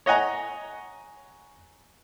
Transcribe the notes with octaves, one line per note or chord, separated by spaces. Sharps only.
C#5 D#5 F#5 G#5 A#5